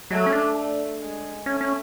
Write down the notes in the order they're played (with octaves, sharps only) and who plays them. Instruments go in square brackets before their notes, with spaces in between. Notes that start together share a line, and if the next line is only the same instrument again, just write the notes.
[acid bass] F#3 [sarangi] A3
[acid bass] C#4
D4
[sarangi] A3
G#3
[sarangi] A3 [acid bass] C#4
[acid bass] C#4